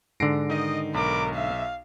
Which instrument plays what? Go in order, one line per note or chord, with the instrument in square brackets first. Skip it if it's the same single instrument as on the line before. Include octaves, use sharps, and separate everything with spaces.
[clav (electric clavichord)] G#2 D3 [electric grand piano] A#6 C7 D7
[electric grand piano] D#3 D#4 [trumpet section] D#5
[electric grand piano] B1 [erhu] A#4 [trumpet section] B5 D6
[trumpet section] E5 [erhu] F5